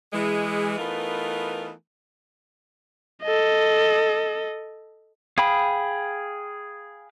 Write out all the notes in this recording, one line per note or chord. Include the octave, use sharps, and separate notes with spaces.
E3 G#3
E3 A3 B3 D#4 F4 A#4
A4 D#5
G#4 F5 G5 B5 D#6